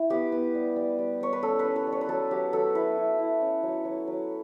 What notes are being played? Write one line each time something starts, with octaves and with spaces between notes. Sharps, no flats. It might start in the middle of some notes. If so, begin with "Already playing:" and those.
Already playing: E4
B3 G4
B3
G3
G3
G3
G3 C#5
B4
C#4 A4
B4
C#4
B4
G3
C#5
B4
F#3 A4
F#3 G4
F#3 A4
E4 B4
E4
E4
C#4
F#3
F#3
F#3